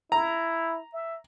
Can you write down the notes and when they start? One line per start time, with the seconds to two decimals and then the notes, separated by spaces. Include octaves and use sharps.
0.12 E4 A#5
0.93 E5